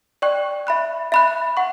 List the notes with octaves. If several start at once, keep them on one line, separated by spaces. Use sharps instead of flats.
D5 G5 C#6 F#6
E5 B5 F#6
E5 B5 F#6
F#5 C#6